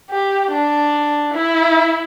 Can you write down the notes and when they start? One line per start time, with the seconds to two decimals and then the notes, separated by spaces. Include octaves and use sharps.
0.10 G4
0.52 D4
1.34 E4